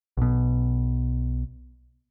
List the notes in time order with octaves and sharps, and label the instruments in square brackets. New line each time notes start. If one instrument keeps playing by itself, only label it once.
[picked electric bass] B1 B2